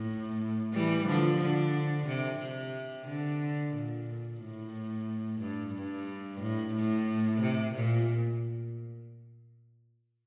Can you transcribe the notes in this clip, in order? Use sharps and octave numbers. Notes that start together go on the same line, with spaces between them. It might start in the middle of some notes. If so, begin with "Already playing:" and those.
Already playing: A2
E3 G3
D3 F3
D3
C3
C3
D3
A#2
A2
G2
G2
A2
A2
C3
A#2